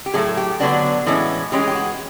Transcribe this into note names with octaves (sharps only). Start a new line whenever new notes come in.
G4
A2 F#3 A3 G#4
G4
D3 F#3 B3 D4 F#4
A2 E3 G#3 C#4
E3 G#3 C#4 G4
G#4
G4
F#4